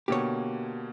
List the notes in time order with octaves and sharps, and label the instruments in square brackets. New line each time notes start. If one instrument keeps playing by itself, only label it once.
[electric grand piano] B2 D3 A#3 [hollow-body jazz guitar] G4 C#5